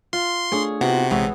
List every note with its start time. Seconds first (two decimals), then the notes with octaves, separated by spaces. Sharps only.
0.13 F4 C6
0.52 A3 D4 G#4 C#5
0.81 C3 B3 D#4 F4 F#4
1.11 A#1 E3 G#3 B3 G#4 C#5